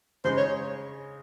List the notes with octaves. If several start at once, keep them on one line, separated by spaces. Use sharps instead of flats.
C#3 G#3 D#4 G#4 C5
C#5